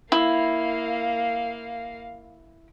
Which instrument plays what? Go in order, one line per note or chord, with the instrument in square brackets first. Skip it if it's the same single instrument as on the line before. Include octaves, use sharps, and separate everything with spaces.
[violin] A#3 F5 [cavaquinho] E4